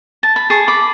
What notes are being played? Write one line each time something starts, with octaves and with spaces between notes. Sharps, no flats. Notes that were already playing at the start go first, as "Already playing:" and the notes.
A5
B5
G#4 A5 C#6
B5 D6